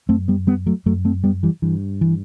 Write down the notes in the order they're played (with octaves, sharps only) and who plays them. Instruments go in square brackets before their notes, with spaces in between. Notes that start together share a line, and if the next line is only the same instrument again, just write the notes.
[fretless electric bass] F#2 A3 C4
G3 B3
G3 B3
F#3 A3
F#2 F#3 A3
A3 C4
G3 B3
E3 G3
G2 E3
E3